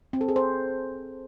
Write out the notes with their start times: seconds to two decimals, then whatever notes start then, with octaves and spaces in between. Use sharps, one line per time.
0.13 C4
0.21 A4
0.28 G#4
0.36 C5